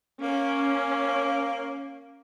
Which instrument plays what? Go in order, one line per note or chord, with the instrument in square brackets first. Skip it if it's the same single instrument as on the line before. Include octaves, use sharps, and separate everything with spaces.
[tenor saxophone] A#3 [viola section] C#4